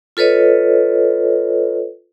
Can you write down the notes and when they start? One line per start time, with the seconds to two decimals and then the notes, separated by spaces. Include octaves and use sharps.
0.17 F4 A4 B4 C#5 D#5